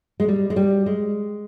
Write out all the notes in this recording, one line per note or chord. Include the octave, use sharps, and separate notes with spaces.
G#3
G3
G#3
G3
G#3